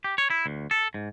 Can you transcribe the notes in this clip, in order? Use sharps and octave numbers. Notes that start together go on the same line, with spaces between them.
G4
C#5
E4
D2
A4
G#2